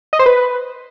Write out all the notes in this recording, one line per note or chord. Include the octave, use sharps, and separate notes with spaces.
D#5
C5
B4